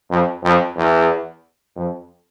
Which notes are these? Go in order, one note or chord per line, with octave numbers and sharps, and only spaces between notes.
F2
F2
E2
F2